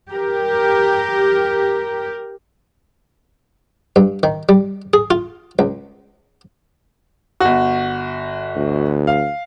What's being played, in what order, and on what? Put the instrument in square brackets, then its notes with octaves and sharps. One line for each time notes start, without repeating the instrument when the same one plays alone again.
[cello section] G4 A#4
[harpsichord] G2
D#3
G3
G#4
F4
C#2
[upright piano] G1 F#4
[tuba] D2
[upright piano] F5